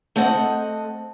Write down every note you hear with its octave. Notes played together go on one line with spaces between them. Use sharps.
A3 C4 A4 D#5 F#5